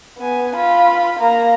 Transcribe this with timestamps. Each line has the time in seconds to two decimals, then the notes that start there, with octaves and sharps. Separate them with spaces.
0.18 B3 G#5
0.57 F4 B5
1.20 A#3 A#5